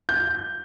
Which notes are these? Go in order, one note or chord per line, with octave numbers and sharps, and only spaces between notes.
G6